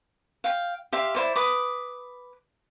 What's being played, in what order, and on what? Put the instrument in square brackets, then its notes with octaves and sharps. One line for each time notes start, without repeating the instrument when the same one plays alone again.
[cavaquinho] F5 G5
G4 E5 F5 C6
E4 C5 D5
B4 D6 D#6